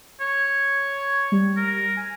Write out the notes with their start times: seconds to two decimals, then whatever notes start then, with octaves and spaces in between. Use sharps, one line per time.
0.20 C#5
1.32 G3
1.57 A#4
1.97 G#5